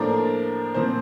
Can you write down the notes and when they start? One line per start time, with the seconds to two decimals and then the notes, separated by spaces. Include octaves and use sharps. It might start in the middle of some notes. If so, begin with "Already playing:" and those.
Already playing: A2 F3 A#3 D4 A#4
0.74 A#2 F3 C4 C5